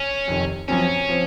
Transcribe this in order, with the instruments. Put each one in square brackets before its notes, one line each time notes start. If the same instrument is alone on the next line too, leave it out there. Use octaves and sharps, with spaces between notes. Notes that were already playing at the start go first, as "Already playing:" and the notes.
Already playing: [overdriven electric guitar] C#4
[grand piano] F2 C3 D#3
[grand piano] F#2 F3 C4 [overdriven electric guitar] C#4
[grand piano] F3 C4